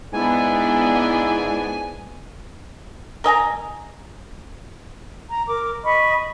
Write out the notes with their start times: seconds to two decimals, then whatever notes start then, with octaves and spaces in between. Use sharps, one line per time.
0.13 G#2 G#3 B3 D4 E4 G#5
3.24 A#4 D#5 G#5 A#5
5.29 A#5
5.47 A#4 D6
5.84 D#5 B5 C#6